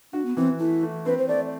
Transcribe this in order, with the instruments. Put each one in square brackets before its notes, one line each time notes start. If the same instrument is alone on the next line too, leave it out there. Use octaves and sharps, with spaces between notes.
[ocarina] D4 [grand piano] F#4
[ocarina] B3
[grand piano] E3 [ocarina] C4
[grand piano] A3 [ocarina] E4
[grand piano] A3
[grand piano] C4 [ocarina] B4
[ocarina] C5
[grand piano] A3 [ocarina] D5